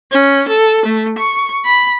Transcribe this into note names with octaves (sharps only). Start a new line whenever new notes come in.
C#4
A4
A3
C#6
B5